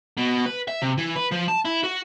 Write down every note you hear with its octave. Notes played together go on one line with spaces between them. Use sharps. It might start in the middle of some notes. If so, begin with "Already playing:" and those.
B2
B4
E5
C3
E3
B4
F3
A5
E4
F#4